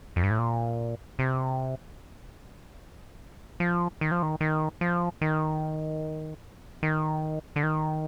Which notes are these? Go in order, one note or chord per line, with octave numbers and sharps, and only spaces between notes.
F2
G2
A2
A#2
C3
F3
D#3
F3
D#3
D#3
F3
D#3
D#3
D3
D#3